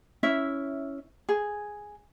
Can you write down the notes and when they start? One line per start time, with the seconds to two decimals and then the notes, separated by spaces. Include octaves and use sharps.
0.23 C#4 E4 E5
1.29 G#4